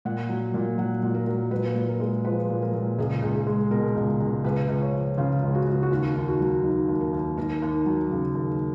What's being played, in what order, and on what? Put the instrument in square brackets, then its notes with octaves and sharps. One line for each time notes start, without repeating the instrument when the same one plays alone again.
[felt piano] A#2 F#5
F#3
A#2
F#3 F#5
A#2
A#4
F#3
A#2 B4
A#2
A#4
G#3
F3 B4
A#2
A#4
A#2
C#2 G#4
C#2
G#4
G#3
B2 A#4
C#2
C#2
C#2 B4
C#2
C#5
F3
C#3 F4
C#2
F#4
C#2
F#4
D#2 F4
D#2
F#4
F#3
D#3
D#2
A#4
D#2
D#2 A#4
D#2
F#3
C#3
D#2